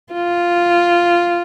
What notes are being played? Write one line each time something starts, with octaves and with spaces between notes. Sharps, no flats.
F4